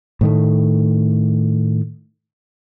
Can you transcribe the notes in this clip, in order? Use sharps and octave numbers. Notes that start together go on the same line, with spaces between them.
A2 D#3 A3